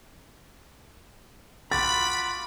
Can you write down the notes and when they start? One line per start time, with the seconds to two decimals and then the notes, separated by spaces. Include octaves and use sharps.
1.72 F4 F#4 B5 D6 A6